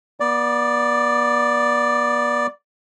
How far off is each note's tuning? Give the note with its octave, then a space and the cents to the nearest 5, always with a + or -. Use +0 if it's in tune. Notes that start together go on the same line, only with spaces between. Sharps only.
B3 -40 D5 +0